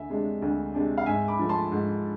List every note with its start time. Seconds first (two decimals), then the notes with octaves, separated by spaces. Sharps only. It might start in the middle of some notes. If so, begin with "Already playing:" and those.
Already playing: D2 E5 G#5
0.10 C3 G#3 D4
0.42 D2
0.74 C3 G#3 D4
0.98 F5
1.06 G#2 E5 G#5
1.28 B5 D6
1.39 F3 A3
1.49 A5 C6
1.72 G#2